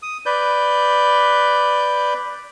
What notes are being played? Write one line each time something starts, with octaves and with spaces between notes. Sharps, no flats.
D#6
B4 D5 G6